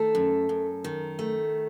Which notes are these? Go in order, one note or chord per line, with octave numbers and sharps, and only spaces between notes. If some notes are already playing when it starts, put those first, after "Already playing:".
Already playing: D#3 A3 A4
F#2
F#2
D#3
A3